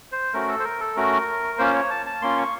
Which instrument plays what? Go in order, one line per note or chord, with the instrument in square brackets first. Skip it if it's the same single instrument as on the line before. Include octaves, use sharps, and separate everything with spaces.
[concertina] C5
A3 C#4 F#4 A#4
A4
C5
A#4
A4
A3 C#4 F#4 A#4
A#3 C#4 F4 C5
C#5
A5
A5
A#3 C#4 F4 C6
C#6